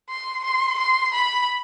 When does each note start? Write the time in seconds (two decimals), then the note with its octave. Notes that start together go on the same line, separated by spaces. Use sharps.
0.09 C6
0.45 C6
0.78 C6
1.14 B5